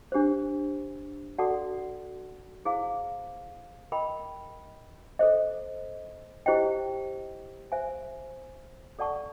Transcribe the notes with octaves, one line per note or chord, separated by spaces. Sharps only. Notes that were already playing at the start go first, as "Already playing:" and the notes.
D4 G4 C5
F#4 A4 D5 F#5 A5
E4 G#4 C5 F5
A#4 D#5 G5 B5
A4 C5 D#5
E4 G4 C5 D#5 G5
C5 E5 G#5
A4 D5 F#5 A5 C#6